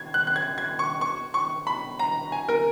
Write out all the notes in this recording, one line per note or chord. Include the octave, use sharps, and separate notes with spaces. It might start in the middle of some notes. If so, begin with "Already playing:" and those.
Already playing: G#6
F#6
F#6
G#6
G#6
C#6
C#6
C#6
B5
A#5
G#5
A#4